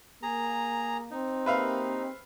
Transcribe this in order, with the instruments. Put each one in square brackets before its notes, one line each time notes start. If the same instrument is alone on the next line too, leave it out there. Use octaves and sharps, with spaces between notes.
[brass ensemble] A#3 [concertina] G#4 A#5
[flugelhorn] C4 [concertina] D#4
[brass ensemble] A#3 G4 G#4 [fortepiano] B4 E5 F5